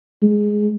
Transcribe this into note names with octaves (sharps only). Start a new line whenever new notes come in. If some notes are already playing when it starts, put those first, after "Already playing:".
G#3